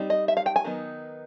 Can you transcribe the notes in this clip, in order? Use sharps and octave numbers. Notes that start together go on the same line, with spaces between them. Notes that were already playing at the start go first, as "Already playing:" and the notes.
Already playing: G3 C4 D#4
D#5
E5
F5
G5
G#5
D#3 F#3 B3 D#4